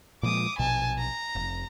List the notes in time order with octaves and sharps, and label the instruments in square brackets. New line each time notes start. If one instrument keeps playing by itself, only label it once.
[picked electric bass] A#2 F3 G#3 [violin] D6 D#6
[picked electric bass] A#1 B2 [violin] G#5 A5
[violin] A#5
[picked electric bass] F1